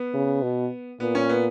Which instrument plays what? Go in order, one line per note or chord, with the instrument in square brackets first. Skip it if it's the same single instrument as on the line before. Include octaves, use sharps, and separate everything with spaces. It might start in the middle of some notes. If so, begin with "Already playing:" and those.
Already playing: [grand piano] B3
[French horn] C#3
B2
[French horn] A#2 [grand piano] B3
[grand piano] C#4
B3